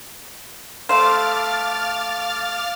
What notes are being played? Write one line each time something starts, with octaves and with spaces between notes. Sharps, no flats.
A3 C5 F5 D6 F6 A6